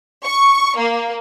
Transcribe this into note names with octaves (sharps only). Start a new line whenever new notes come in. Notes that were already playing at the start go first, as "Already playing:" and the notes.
C#6
A#3